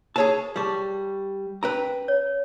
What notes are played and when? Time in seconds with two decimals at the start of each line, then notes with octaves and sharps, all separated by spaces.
0.16 G#4 A#4 C5 C#5 A5
0.56 G3 G#4 A5 C#6 D6
1.63 C#4 A#4 B4 G5 A#5
2.08 C#5